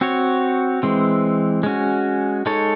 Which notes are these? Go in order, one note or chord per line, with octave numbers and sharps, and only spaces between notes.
C4 F#4 C#5
E3 G#3 C4
G#3 C#4 F#4
G#3 D#4 A4 C#5